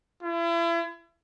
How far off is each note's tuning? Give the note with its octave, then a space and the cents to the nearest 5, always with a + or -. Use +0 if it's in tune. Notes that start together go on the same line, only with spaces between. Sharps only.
E4 +40